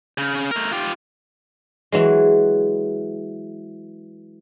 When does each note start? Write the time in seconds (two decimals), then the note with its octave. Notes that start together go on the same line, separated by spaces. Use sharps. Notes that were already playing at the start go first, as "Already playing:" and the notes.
0.18 C#3
0.51 A3 A#4
0.71 F4 G4
1.92 E3 F#3 G#3